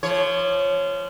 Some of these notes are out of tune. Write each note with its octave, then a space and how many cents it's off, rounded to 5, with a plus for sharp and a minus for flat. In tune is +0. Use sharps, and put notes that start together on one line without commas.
F3 -25 C#5 +0